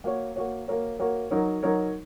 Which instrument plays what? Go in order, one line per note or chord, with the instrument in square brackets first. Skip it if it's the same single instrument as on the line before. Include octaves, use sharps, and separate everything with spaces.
[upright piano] A#3 F#4 C#5
A#3 F#4 C#5
A#3 F#4 A#4 C#5
A#3 F#4 A#4 C#5
F#3 D#4 A#4 C#5
F#3 D#4 A#4 C#5